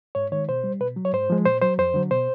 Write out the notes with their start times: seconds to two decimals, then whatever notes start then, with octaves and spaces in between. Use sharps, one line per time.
0.15 G#2 C#5
0.32 D#3 G#3 C#5
0.49 B2 C5
0.64 G3
0.80 B2 B4
0.96 F#3
1.05 C#5
1.13 G#2 C5
1.30 F3 G#3
1.45 A#2 C5
1.62 F#3 C5
1.78 F2 C5
1.94 D3 F#3
2.10 B2 C5